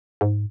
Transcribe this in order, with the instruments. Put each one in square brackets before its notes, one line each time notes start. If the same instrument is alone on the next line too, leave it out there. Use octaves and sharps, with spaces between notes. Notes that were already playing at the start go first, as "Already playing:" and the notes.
[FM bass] G#2